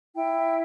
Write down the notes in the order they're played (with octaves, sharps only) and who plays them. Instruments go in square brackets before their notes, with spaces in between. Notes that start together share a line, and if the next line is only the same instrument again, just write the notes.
[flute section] E4 G5